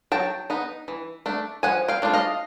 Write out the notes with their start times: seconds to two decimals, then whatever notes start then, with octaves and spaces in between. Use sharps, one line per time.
0.12 F#3 G5 A5
0.50 B3 D#4
0.88 E3
1.26 A3 D4
1.63 F3 F#5 G#5
1.88 F5 G5
2.02 A3 D4 F4
2.13 D#5 F5